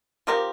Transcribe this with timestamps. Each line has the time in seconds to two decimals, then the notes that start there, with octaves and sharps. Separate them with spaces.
0.27 F3 C4 G4 A#4